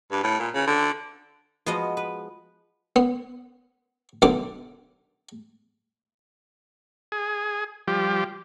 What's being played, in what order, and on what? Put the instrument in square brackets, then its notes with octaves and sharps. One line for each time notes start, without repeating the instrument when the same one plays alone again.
[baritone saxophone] G2
A2
A#2
C#3
D3
[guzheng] F3 G#3 B3 F#4 D#5
B4
[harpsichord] B3
B1 D3 B3 D6
[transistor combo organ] G#4
F3 G3 G4